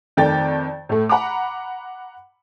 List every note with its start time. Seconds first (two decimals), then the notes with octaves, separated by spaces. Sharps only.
0.17 F2 D#3 A3 D5 G5 A6
0.89 A2 A3
1.09 F#5 A#5 B5 D6